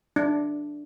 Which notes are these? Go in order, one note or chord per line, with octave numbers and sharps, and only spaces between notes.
D4